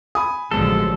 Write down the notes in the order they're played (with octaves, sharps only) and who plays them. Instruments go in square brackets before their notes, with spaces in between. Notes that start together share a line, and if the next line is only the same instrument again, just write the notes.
[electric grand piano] G#5 [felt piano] B5 D#6
[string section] A1 D3 F3 [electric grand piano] B2 F#3 G#3 [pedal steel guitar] A4